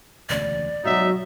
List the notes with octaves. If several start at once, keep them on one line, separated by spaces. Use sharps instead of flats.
E1 D2 C#3 D5
G#2 B2 F#3 D#4 E5